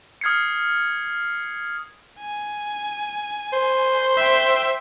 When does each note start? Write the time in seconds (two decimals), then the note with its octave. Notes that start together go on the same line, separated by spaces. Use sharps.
0.21 D#6 F6 G#6 C7 C#7
2.19 G#5
3.53 C5
4.17 E5 G5